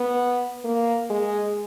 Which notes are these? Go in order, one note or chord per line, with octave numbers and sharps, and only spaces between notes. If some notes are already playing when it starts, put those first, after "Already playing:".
Already playing: B3
A#3
G#3